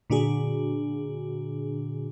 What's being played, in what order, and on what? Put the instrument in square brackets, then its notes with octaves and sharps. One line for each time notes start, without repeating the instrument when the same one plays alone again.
[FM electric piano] A#2 D3 D4 F#4 G#4